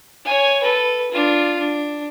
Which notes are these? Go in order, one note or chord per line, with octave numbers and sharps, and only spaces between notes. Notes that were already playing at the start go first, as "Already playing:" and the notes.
C#5 G#5
A4 B4
D4 F4
D4